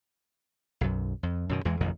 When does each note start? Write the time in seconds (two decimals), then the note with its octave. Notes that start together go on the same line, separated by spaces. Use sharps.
0.81 B1 F#2
1.23 F2
1.49 F#2 B2 D#3
1.65 E2 E3 G#3
1.80 A1 F2 C3 D#3